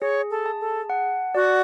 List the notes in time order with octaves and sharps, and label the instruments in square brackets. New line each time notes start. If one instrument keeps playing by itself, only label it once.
[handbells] G#4 [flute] C#5
[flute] A4
[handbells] A5
[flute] A4
[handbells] F#5
[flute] F#4 [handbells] D5